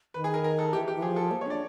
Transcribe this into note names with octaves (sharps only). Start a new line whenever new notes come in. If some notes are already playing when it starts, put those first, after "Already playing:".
D#3 B4
G#4
A#4
A#4
A4
E3 G4
G4
E3
F3 G#4
A4
A#3
C#5
D4 D5